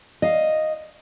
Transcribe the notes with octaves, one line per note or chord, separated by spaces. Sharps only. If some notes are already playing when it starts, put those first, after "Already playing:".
D#5 F5